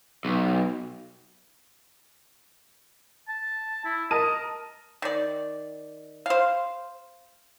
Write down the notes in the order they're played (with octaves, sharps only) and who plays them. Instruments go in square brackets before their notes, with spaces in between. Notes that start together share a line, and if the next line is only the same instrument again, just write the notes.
[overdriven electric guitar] B1
[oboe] A5
E4
[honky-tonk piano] A#4 A5 D#7 [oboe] D#5
[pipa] D#3 D5
C5 F5